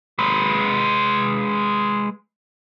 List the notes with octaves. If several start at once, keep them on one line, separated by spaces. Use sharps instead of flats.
G#3 B4